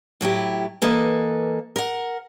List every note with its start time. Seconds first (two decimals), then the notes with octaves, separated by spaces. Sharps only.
0.21 A2 F#3 E4 G4
0.82 E3 A#3 A4 B4 D#5
1.76 A#4 F#5